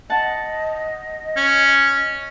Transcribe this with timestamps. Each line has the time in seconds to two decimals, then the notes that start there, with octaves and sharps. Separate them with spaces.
0.10 D#5 F#5 A5
1.36 C#4